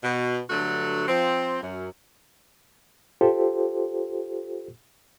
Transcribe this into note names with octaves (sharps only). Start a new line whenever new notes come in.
B2
G2 D3 F#3 A3 F#4
F3 C4
F#2
F4 G4 A4 C5